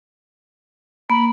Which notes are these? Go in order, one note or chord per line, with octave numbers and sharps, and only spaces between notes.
A#3 B5